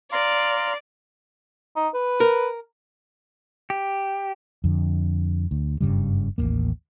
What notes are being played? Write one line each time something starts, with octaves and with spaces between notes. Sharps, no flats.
D5 F5 A#5 C6
D#4
B4
A#4
G4
F2 D3
D2
F#1 G2 C#3 G3
A1 D#2 G#2 A#3